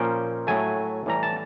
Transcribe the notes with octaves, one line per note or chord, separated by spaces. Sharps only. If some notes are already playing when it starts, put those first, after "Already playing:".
Already playing: A#2 F3 A#3 C#4 G5
A2 F#3 A3 G#5
A2 E3 G3 A#5
A5